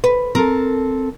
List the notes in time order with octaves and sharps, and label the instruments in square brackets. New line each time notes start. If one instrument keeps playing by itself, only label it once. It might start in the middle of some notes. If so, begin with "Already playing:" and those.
[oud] B4
[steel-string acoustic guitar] C4 A4 [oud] A#4